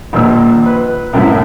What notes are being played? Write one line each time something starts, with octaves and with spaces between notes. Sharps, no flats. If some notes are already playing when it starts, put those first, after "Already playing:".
A#1 D#2 A#2 E6
B4
C2 F#2 A2 E4 E5